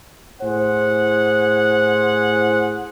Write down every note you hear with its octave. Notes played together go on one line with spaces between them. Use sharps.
A2 G#4 C5 F#5